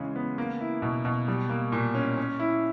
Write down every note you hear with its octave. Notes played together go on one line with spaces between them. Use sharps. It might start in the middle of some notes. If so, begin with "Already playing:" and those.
Already playing: C#3 E3 G#3
B3
A#3
E4
B2
B2
G3
A#3
A#2
C#4
C#4
E4